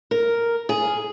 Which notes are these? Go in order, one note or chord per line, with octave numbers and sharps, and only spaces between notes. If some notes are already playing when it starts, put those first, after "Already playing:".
A#4
G#4